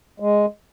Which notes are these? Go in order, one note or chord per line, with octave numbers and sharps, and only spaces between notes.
G#3